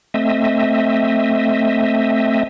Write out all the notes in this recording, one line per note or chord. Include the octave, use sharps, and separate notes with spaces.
A3 C4 D#5 E5